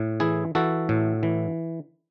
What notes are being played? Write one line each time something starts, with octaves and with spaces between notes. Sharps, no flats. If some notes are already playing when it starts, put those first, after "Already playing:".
Already playing: A2
E3 E4 G#4
E3 F#4 A4
A2
E3